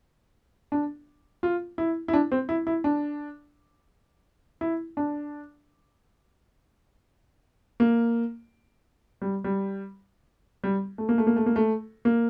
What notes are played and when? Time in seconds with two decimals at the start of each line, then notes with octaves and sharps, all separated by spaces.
0.72 D4
1.43 F4
1.78 E4
2.08 E4
2.13 D4
2.32 C4
2.49 E4
2.67 E4
2.84 D4
4.61 E4
4.97 D4
7.80 A#3
9.22 G3
9.44 G3
10.64 G3
10.98 A3
11.09 A#3
11.18 A3
11.27 A#3
11.36 A3
11.46 A#3
11.56 A3
12.05 A#3